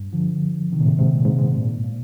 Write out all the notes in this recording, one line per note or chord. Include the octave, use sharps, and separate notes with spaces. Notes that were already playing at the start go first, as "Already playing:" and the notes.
Already playing: G2
D3 F3
C3 D#3
A#2
G#2 C3
G#2 C3
A#2
G#2 C3
G#2
A#2
G#2
A#2